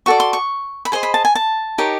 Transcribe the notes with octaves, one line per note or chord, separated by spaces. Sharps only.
F#4 A4 D5 C#6
C6
C#6
B5
G#4 C5 D#5 C6
B5
A5
G#5
A5
D#4 G4 A#4 C#5